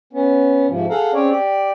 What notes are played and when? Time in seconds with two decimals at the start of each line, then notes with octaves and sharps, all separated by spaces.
0.13 B3 C#4
0.68 G#2 C3 F3
0.90 G#4 A4 F5 F#5 A#5
1.14 C4 C#4 G#4 C#5 D5
1.30 G4 D5